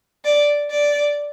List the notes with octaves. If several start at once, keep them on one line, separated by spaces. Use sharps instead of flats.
D5
D5